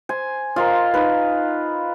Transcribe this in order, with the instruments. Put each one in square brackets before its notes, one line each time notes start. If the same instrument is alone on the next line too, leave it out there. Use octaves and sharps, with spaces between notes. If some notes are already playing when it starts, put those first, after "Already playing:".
[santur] C5 [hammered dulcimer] G#5
[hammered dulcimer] F4 [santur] A#4 C5 D#5
[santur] D#4 B4